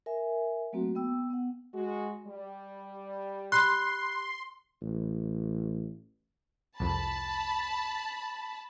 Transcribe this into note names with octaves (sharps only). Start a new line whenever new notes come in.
A#4 E5 G#5
F#3 A3 A#3 C4 F#4
B3 G5 E6
B3 F#5
G#3 F#4
G3
G4 B5 C6 F#6
A1
C2 F2 A5 B5